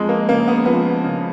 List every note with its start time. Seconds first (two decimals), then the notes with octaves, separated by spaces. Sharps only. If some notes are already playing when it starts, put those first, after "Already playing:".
Already playing: F2 G#3
0.09 A#3
0.29 C#3 A#3
0.48 B3
0.66 F3 B3
1.04 C#3